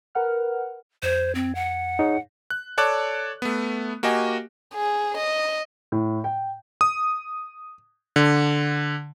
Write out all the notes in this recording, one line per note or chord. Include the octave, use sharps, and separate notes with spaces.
A#4 B4 F#5 F6
F2 C5 G#6
C4
F#5
D#4 G#4 C#5
F#6
A4 C#5 D5 A5 D6 F#6
A3 B3
A#3 F#4 G4 D#5 G#5
G#4
D#5
A2
G5
D#6
D3